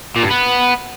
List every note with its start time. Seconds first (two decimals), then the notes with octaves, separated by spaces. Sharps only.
0.16 A#2
0.23 G2
0.31 B3